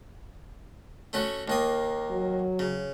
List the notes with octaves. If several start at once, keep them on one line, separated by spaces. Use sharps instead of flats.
A3 C#4 F#4
D#2 A#3 D#6
F#3
C#3